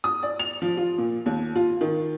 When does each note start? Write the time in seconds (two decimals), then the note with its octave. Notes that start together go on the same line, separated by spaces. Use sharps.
0.04 D#6
0.23 D5
0.39 F7
0.62 F3
0.77 F4
0.98 A#2
1.26 D#2
1.56 F4
1.81 D#3